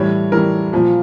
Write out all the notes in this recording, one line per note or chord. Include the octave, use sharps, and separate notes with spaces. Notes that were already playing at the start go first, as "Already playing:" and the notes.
Already playing: A2 E3 G3 C#5
A2 E3 G3 A#4
A#2 F3